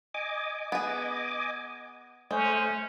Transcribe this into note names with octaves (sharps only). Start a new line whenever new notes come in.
D#5 G#5 D6
B3 G#4
G#3 A3 C#4 C5